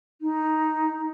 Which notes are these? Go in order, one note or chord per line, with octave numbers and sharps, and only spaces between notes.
D#4